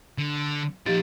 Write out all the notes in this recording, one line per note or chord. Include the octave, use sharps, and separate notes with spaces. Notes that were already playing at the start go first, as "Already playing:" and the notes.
D3
A#2 F3 D#4 G4 A6